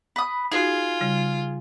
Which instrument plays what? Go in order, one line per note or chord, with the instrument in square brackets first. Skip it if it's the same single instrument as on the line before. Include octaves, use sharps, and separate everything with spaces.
[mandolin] B4 D#6
[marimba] D#4 F#4 [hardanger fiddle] F4 [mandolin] G#4
[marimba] C#3 G3